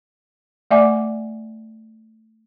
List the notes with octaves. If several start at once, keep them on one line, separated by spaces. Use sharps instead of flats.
A3 D5 E5 F#5 G#5 D6